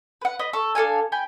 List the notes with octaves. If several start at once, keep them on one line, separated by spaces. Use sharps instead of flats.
B4 F#5
B4 D#5
A4 C#6
D4 A4 F5 G#5
G5 G#5 B5